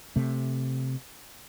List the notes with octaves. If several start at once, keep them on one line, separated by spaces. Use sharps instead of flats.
C3 A3